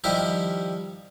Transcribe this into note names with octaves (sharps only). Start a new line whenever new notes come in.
D#3 F3 G3 E4 G4 A#4